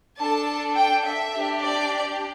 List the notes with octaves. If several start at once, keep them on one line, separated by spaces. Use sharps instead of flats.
D4 A4 A5
G5
E5
D4 G4
D5